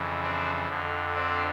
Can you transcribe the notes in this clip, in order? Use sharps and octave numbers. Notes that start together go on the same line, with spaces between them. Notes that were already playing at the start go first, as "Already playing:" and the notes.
Already playing: F2 C#3 E3
C4 D4
F2 D3
C4 D4